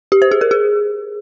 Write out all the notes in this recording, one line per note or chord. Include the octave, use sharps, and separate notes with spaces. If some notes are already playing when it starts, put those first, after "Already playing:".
G4
C5
G#4
A#4
G#4